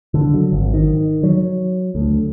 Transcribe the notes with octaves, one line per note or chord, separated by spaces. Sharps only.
D3
F#3
G#1
D#3
F#3
D2